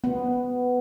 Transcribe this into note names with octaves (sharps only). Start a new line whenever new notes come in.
B3